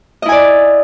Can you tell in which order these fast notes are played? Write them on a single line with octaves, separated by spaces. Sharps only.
D#5 E4 G#5 D5